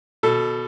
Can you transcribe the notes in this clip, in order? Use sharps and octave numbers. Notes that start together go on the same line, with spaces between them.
B2 A4